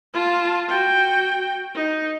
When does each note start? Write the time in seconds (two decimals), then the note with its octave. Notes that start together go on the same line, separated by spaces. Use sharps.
0.14 F4 A5
0.69 F#4 G5
1.75 D#4